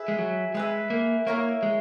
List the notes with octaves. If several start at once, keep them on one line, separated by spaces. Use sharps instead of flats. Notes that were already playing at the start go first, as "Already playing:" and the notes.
Already playing: G#4 B4 E5
G#3
F#3
G#3 G#4 B4 E5
A#3
A#3 E4 A#4 C#5
G#3